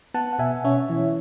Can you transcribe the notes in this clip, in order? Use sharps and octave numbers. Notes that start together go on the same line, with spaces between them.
B3 F#5 A5
F#5
B2 E5 G#5
C#4 C#5 E5
E3